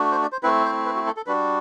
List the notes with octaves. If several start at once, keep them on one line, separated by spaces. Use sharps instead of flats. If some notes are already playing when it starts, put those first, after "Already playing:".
Already playing: A3 D4 F#4
C5
D5
C5
A3 C4 E4 B4
C5
B4
F#4
A4
A4
G3 D4 F#4 B4